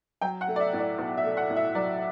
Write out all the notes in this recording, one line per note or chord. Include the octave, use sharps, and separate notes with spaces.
F#3 G5
F#5
A3
D5
E5
A2
D5
B1
E5
A3
F#5
A2
E5
F#3 D5